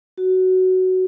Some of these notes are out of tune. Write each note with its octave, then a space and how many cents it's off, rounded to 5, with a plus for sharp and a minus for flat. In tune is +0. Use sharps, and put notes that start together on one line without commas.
F#4 +10